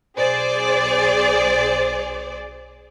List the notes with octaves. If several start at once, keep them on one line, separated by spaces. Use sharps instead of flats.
B1 G#4 C5 D5